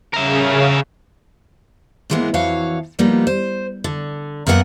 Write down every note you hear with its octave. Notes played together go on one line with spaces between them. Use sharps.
C#3 A#4 E5
G#2 E3 G#3 A#3 B3
F2 E3 F#4 C#5 F5
F3 G3 A#3 B3 D#4
C5
D3
F#2 A#3 B3 A#4 F#5 G#5